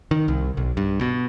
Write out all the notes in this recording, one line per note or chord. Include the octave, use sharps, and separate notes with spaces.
D#3
C2
B1
G2
B2